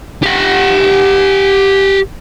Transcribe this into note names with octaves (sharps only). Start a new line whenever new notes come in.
G4 F#5